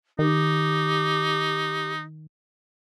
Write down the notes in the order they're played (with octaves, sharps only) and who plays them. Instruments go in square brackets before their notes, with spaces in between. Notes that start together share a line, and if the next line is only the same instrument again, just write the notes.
[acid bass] D#3 [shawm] D#4 [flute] G4